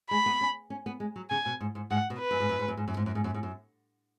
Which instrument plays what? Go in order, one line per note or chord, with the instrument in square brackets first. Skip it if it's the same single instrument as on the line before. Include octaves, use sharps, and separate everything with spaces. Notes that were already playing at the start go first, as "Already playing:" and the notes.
[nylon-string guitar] G#3 [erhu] B5
[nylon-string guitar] B3
C#4
C#4
B3
G#3
F#3
[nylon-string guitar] C#3 [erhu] G#5
[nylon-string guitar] B2
G#2
G#2
[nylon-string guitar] G#2 [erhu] F#5
[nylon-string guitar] B2
[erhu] B4
[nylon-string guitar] F#2
G#2
F#2
G#2
F#2
G#2
F#2
G#2
F#2
G#2
F#2
G#2
F#2